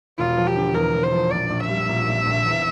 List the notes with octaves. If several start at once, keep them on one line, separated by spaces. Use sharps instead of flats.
E1 F4
F3
G4
D3
E2 A#4
E1
C5
F3
A#1 D5
A#1
E5
G3
A#2
A#1
A#1
E2